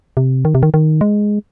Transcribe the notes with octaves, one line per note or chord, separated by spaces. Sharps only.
C3
D#3
C3
D#3
D#3
G#3